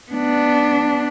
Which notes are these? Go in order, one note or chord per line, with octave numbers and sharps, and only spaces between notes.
B3 D4